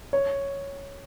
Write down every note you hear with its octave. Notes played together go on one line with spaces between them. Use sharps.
C#5